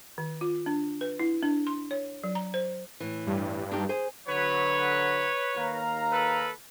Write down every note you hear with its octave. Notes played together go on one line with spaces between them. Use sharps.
D#3
F4
D4
B4
E4
D4
C6
C#5
F#3
A#5
C5
A2 E3
G2
D4 D#4 G4
G#4 C5 G#5
D3 F#3 B4 C#5
D#2 F5 A#5
A4 B4